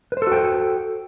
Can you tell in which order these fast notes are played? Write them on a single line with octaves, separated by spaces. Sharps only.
B4 C5 A4 F#4 G5